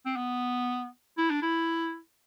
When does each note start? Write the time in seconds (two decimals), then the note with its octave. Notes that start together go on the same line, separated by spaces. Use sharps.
0.06 C4
0.16 B3
1.18 E4
1.30 D4
1.42 E4